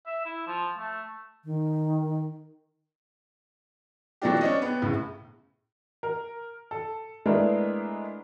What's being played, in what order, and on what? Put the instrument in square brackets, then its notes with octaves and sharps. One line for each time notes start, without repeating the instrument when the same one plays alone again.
[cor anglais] E5
E4
F3
A3
[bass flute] D#3
[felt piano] E3 F#3 A3 D4 F4 G4
C#4 D4 D#5
B3 C4
A#1 A2 C#3
[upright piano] A#4
A4
G#3 A3 B3 D4 E4 A#4